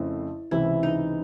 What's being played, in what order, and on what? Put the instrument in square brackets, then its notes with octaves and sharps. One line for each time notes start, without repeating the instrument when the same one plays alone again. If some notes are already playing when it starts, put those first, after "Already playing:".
Already playing: [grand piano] F2 C#3 A3 C4 [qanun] E4
[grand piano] C#2 C3 E3 [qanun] E4
[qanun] D#4